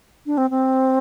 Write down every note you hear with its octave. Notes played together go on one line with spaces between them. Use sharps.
D4
C4
C4